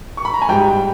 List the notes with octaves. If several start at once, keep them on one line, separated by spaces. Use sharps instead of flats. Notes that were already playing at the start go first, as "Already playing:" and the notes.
C#6
B5
A#5
G#5
G#2 G3 G5